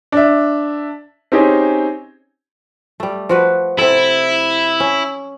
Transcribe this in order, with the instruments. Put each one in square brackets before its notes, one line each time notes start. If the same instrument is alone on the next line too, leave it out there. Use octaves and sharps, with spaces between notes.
[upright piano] D4 E5
C4 C#4 D#4 G4 G#4
[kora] G3 A3
F3 F#4 B4
[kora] C3 A4 [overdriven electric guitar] E4
[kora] C#4